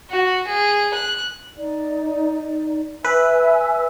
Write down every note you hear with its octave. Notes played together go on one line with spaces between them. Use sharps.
F#4
G#4
F#6
D#4 D5
B4 E5 G#5 E6